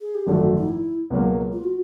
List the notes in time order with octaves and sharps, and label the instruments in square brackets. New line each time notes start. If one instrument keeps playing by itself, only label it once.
[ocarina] G#4
G4
[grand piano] G#1 F#2 D3 F3 A3 [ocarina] F#4
[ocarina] D#4
E4
[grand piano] C#2 B2 F#3 A#3
[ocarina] F4
F#4